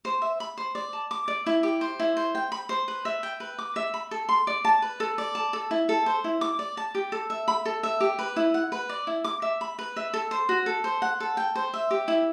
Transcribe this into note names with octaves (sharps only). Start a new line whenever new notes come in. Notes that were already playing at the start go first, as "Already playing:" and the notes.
C5
E5
B5
C5
D5
A5
D6
D5
E4
G4
C5
E4
C5
G5
B5
C5
B4
E5
G5
B4
D6
E5
B5
A4
C6
D5
A5
B4
A4
D5
A5
A4
E4
A4
C5
E4
D6
D5
A5
G4
A4
E5
B5
A4
E5
G4
B4
E4
F#5
B4
D5
E4
D6
E5
B5
B4
E5
A4
C5
F#4
A4
C5
F#5
A4
G5
C5
E5
G4
E4